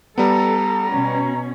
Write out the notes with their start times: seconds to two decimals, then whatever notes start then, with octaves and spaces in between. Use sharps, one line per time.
0.18 G3 B3 A4 A#5
0.90 B2 C#4